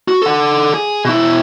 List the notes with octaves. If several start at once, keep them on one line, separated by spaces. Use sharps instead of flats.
F#4
A4 F#5
G#4
B2 E4